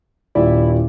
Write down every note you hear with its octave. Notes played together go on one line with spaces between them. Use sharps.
D#1 E4 D5